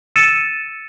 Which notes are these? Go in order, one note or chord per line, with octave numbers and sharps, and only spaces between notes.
E6 A6 C#7 D#7 E7